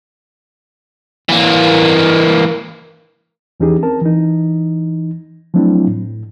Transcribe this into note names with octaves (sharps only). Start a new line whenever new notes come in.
E3 A#3
E2 E3 C#4 D#4 G4 G#4
C4 A#4 A5
E3 D#4
F3 F#3 A3 C4 D4 E4
A2